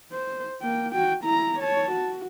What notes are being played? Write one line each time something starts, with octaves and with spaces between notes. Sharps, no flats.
C5
A#3 G5
F#4 G5
E4 A#5
C#5 A5
F#4